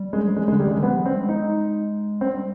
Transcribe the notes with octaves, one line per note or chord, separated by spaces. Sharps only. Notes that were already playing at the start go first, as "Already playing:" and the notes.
Already playing: G3
G#3
F3
G3 G#3
G#3
D3
G3
D#3 G#3
F3 B3
G3
C4
G#3
D#4
G3 C4